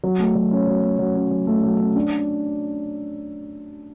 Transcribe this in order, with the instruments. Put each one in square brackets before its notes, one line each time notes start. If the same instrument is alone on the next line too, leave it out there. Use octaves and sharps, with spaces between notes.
[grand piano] F#3
A3
F#3
C#4
F#3
A3
F#3
C#4
F#3
A3
F#3
C#4
D4